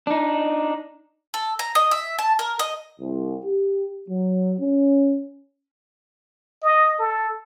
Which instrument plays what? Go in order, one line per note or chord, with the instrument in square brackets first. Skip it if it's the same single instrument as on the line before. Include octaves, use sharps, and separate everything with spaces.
[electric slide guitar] D4 D#4
[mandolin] A4
A#5
D#5
E5
A5
A#4
D#5
[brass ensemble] C2
G4
F#3
C#4
[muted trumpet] D#5
A4